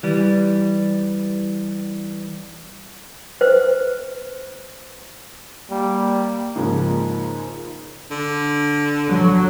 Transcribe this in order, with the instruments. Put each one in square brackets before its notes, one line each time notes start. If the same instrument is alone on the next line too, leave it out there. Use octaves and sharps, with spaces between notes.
[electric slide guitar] E3 G3
[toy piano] B4 C5
[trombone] G3 [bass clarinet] A#3
[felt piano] G#2 C#3 F3 A#3 G#4
[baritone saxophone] D3
[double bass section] F#3